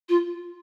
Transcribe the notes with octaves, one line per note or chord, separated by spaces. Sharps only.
F4